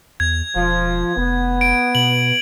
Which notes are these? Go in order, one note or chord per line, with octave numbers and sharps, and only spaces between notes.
E2 G#6
E1 F3
F1 B3
D7
B2 F#7